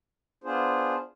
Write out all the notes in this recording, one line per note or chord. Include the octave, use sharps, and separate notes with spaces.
B3 D4 F4 G#4 C5